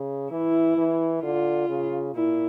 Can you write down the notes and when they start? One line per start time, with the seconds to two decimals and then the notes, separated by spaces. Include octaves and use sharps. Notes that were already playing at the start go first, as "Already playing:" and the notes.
Already playing: C#3
0.31 E3 E4
0.77 E3
1.23 D3 F4
1.69 C#3
2.15 A#2 E4